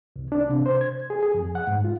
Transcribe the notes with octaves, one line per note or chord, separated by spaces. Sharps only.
C2
D4
C3
C5
G#6
G#4
G#4
F2
F#5
G#2
F4